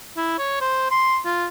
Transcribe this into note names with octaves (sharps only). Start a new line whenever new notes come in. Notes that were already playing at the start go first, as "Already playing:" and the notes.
E4
C#5
C5
C6
F4